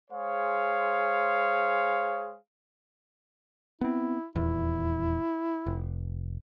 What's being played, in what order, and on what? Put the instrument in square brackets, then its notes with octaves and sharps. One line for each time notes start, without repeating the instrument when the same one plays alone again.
[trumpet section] G#3 G#4 C5 C#5 F5
[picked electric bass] B3 C4 [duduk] E4
[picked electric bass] D#1 E2 [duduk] E4
[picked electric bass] F1